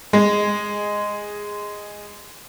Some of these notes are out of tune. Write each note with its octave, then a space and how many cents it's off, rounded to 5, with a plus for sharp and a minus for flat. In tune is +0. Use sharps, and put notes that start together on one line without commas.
G#3 -5